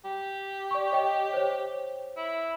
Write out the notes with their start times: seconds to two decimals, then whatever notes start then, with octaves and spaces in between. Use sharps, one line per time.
0.05 G4
0.71 D5 C#6
0.92 C#5 D#5 G5
1.33 C5 C#5
2.17 E4